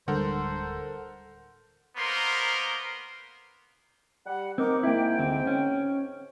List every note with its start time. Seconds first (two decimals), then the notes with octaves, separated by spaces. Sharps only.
0.08 D1 D3 G3 G#3 A4 A#4 C5 F#5
1.97 A#3 B3 A#4 C5 C6
4.26 G3 F#5
4.58 C4 D#4 A#4 D6
4.83 G#2 A#3 E4 G5
5.19 D2 C4
5.47 C#4